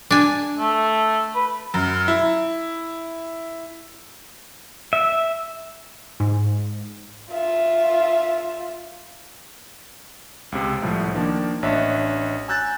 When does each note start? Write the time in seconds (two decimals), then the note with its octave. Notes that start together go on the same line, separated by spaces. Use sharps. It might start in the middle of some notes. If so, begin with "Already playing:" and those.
0.11 D4 G#5
0.57 A3
1.35 B4
1.74 F#2
2.08 E4
4.93 E5
6.20 G#2
7.31 F4 E5
10.52 C#2 C3
10.82 C2 A2 F3
11.14 D#3 F3 A#3 D4
11.63 A1 D4 C#5 D#5 E5 B6
12.48 G#5 A#5 E6 F#6 G6 A6